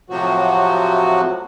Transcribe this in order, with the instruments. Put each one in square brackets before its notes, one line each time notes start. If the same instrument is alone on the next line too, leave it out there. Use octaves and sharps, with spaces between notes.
[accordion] A2 C3 F3 F#3 F#4